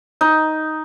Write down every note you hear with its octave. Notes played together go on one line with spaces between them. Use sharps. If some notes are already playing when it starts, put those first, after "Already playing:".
D#4